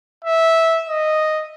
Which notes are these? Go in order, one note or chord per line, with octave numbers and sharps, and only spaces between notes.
E5
D#5